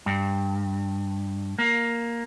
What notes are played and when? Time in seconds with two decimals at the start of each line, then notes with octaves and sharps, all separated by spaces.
0.06 G2
1.59 A#3